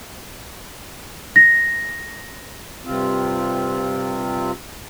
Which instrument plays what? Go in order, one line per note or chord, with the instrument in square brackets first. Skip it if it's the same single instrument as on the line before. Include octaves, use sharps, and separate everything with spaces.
[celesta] A#6
[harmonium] G2 C3 C4 F4